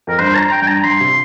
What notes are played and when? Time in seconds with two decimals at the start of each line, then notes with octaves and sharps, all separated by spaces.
0.07 F2 A#4
0.19 G2 C5
0.36 A#5
0.52 G5
0.62 G2 G5
0.68 A#5
0.84 G2 C6
1.00 C3